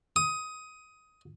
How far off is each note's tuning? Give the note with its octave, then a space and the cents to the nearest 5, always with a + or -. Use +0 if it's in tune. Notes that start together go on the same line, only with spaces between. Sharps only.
D#6 +15